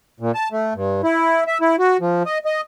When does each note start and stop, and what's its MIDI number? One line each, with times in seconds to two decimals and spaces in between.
0.20 0.32 46
0.34 0.48 81
0.52 0.74 57
0.74 1.02 43
1.04 1.44 64
1.47 1.58 76
1.61 1.76 64
1.79 1.97 66
2.01 2.23 53
2.26 2.38 75
2.45 2.61 75